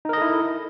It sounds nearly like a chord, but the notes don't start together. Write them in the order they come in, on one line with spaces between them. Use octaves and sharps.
D#4 A#4 D#5 A4 E4